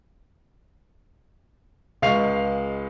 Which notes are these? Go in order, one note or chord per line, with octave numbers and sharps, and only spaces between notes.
C#2 G#3 F5 C#6 C7 F7